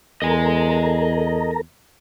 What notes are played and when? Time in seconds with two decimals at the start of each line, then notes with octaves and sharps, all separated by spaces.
0.22 E2 A4 A#4 D#5 G#5 A#5